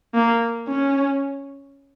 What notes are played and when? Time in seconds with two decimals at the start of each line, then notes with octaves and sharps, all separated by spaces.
0.15 A#3
0.68 C#4